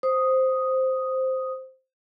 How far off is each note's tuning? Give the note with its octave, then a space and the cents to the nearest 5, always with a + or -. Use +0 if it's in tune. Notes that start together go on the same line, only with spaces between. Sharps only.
C5 +0 D#6 +0